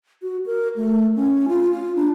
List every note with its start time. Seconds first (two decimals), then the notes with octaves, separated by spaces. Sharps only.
0.22 F#4
0.46 A#4
0.76 A3
1.16 C#4
1.48 F4
1.71 F4
1.95 D4